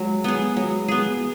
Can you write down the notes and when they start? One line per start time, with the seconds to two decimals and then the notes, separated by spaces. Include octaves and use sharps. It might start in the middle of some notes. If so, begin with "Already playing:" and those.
Already playing: F#3 G#3
0.24 B3 G#4
0.57 F#3
0.88 B3 G#4